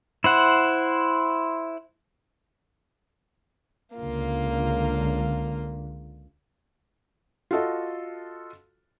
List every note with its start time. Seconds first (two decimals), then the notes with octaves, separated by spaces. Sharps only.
0.24 E4 C5 F#5
3.96 C#2 D3 A#3 F4
7.51 F4 F#4 A4 D#5